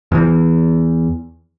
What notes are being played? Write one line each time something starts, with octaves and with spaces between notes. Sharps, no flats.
E2 E3